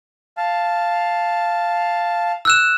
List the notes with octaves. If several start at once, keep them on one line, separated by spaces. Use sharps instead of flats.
F5 A5
E6 F#6 E7